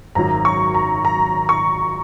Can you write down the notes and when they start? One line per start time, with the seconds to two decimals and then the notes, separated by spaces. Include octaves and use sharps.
0.15 G#1 F#2 D#3 F#3 A#5
0.45 C#6
0.74 A#5
1.05 A#5
1.49 C#6